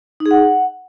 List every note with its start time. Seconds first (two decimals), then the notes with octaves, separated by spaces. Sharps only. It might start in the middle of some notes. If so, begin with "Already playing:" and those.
0.20 D#4
0.26 G#4
0.31 F#5